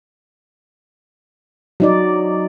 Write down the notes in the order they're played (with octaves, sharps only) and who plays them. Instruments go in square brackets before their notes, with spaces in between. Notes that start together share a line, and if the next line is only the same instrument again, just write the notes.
[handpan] F#3 D#4 D5